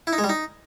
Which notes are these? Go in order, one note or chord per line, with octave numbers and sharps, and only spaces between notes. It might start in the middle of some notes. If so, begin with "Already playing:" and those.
E4
D#4
G#3
G3
D#4